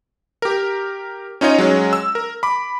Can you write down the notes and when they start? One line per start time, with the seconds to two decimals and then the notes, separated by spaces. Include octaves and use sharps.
0.42 G4 A#4
1.41 C#4 D#4 F4 C#5 D#5
1.58 F#3 G#3 C#4
1.93 E6
2.15 A#4
2.43 B5 D6